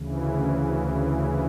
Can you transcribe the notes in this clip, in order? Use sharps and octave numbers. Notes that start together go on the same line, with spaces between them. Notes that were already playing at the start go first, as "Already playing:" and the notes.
Already playing: D2 C#3 E3
C#4